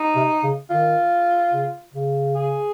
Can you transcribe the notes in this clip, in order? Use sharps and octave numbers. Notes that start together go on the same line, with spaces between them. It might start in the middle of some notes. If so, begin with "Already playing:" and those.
Already playing: D#4
C3
C#3
D#3 F4
C#3
C#3
G#4